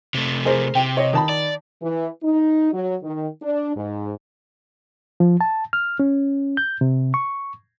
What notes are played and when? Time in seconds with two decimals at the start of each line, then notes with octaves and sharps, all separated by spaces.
0.14 C3 A3
0.45 G#4 A#4 C5
0.75 C3 G5
0.97 C#5 D#5
1.13 D#3 A5 B5
1.29 D5
1.82 E3
2.24 D#4
2.73 F#3
3.03 D#3
3.42 D4
3.76 G#2
5.20 F3
5.41 A5
5.73 F6
5.99 C#4
6.57 G6
6.81 C3
7.14 C#6